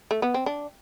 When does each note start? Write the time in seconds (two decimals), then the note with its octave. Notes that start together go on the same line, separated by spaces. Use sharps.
0.11 A3
0.22 B3
0.34 C4
0.46 D4